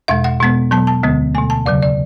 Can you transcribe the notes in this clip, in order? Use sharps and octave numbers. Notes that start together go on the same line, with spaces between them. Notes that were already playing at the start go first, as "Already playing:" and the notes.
E2 B2 G#3 E5
F#5
B2 G#3 B3
B2 F#3 B3 A5
A5
D2 D3 G#3 B3
B2 A3 G#5
A5
E2 C#3 F#3 D5
D5